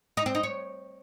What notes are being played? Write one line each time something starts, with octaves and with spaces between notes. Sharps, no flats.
D#4
C4
D#4
C#5